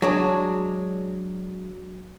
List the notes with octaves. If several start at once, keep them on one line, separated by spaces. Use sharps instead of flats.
F#3 G#3 D4